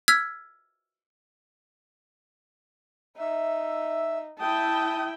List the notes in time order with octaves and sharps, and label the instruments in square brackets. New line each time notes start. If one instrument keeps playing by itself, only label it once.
[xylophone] E6 F6 G#6 B6
[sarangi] D#4 [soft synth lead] E5
[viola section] E4 G5 [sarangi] A5 [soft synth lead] D#6